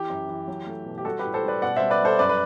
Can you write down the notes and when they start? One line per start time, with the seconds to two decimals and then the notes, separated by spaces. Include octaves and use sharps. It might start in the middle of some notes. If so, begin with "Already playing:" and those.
Already playing: E3 G4
0.10 F#2
0.28 E3
0.48 F#3
0.67 A3
0.85 B2
0.98 G4
1.05 G3 F#4 A4
1.19 G4 B4
1.25 A2
1.34 A4 C5
1.43 G3
1.48 B4 D5
1.62 B2 D5 F#5
1.76 G3 C5 E5
1.90 B4 D5
2.00 G3 A4 C5
2.19 F#2 B4 D5
2.29 B4